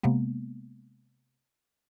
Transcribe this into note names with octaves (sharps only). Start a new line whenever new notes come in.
C3 G#3 A#3 B3